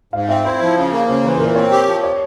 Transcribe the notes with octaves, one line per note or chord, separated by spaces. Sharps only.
G#2 F5
C4 E5
E4 C5
F3
C#3
A#3
C#3 C5
E3 C5
C5
A#2 A#4
C4 C#5
G4
F3
C#5